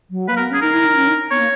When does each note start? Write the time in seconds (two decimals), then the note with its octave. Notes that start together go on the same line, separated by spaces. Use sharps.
0.11 F#3
0.28 A#3 B4
0.37 A#4
0.40 B3
0.51 C#4 G#4
0.62 D#4 A#4
0.74 E4
0.85 D#4
0.96 C#4
1.08 D#4
1.31 B3 C#5
1.39 A#3